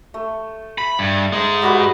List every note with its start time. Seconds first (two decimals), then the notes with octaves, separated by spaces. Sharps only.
0.14 A3
0.78 B5
0.99 G2
1.32 G#3 D#4
1.62 G3 F#4 B4